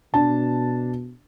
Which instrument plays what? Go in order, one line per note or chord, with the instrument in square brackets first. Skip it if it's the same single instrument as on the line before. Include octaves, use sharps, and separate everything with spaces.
[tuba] B2 [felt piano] D4 A5